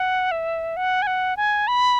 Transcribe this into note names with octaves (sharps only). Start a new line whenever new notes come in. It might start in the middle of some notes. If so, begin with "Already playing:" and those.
Already playing: F#5
E5
F#5
G#5
F#5
G#5
B5